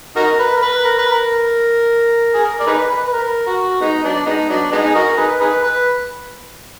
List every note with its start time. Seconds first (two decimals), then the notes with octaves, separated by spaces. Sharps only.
0.16 D#4 F#4 A#4
0.39 B4
0.57 A#4
0.62 B4
0.84 A#4
0.98 B4
1.12 A#4
2.34 G#4
2.44 A#4
2.60 D5
2.67 D#4 G#4 B4
2.90 B4
3.08 B4
3.13 A#4
3.47 F#4
3.81 G#3 B3 D#4
4.04 F#3 B3 D4
4.26 G#3 B3 D#4
4.49 F#3 B3 D4
4.72 G#3 B3 D#4
4.83 G#4
4.95 D#4 F#4 A#4
5.17 D#4 G#4 B4
5.41 D#4 G#4 B4
5.63 B4